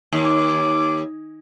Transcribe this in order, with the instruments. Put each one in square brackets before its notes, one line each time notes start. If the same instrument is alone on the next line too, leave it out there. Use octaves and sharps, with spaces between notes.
[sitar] D#2
[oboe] D6